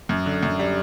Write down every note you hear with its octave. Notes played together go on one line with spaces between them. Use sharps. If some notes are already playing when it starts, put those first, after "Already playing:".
F#2
D3
F#2
G3